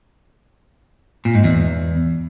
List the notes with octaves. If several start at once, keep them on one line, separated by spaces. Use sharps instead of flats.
A#2
G#2
E2